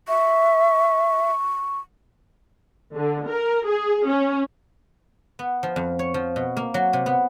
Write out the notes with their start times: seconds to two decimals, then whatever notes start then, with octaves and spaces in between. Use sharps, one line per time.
0.08 E5 C#6
2.95 D3
3.27 A#4
3.66 G#4
4.08 C#4
5.39 B3
5.63 F3
5.76 F2
5.99 C#5
6.14 F3
6.36 B2
6.57 A#3
6.74 F#3
6.93 C3
7.06 B3